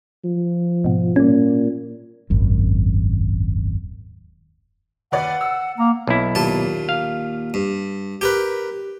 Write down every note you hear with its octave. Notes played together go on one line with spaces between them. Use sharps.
F3
G#2 B2
A#2 G3 C#4
D#1 G#1 F#2
D#2 B4 D5 F#5
E6
A#3 A#5
B1 E4
D#2 A#2 A5
F5
G2
G4 A#4 B4